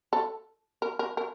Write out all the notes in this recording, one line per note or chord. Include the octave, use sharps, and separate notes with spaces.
A4
A#4
A#4
A#4